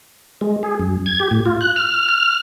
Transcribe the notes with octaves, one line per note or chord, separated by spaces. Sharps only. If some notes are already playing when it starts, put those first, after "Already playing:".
G#3
G#4
F#2
G#6
G4
A2
F4
F#6
F6
F6